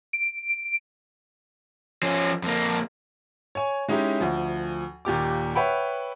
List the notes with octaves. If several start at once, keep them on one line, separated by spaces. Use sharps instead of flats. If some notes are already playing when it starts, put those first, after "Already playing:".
D7
F3 C#4
F2 A#3
C#5 G#5
G#3 C#4 D#4 E4 G4
D2 F3
D#2 A#2 G4 D6
B4 C#5 E5 F#5 G5 B5